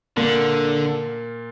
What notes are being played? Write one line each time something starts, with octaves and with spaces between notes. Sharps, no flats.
A#2 D3 A#3